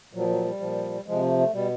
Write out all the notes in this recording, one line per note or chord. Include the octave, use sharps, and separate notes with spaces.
A#2 F3 F#3
F#3
G3
A#2 F3
C3 F3 G#3
A3
A3
B2 G3